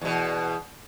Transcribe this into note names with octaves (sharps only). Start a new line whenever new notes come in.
E2 B2